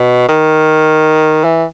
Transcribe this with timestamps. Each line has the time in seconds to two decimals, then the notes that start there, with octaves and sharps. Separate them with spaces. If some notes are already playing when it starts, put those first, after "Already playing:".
Already playing: B2
0.29 D#3
1.44 E3